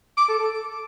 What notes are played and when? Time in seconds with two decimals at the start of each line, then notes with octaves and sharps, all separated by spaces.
0.17 D6
0.28 A4
0.39 A4